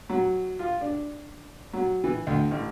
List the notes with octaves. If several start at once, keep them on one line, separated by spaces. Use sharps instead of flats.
F#3
F4
D4
F#3
E3
D2
A1